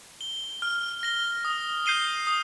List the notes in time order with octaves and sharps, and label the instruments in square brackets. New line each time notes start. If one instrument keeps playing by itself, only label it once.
[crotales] G7
F6
A#6 G7
D#6
G6 C7 D#7 G7
D#6